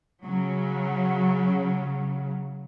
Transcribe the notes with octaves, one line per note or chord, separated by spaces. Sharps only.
C#3 F#3